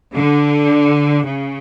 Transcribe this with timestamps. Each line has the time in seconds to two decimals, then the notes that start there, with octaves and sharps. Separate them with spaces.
0.16 D3
1.25 C#3